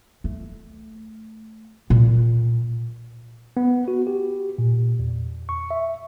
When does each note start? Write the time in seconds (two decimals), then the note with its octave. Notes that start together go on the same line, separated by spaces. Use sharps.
0.24 A3
1.90 A#2
3.57 B3
3.88 F#4
4.07 G4
4.58 A#2
4.99 E2
5.49 C#6
5.71 E5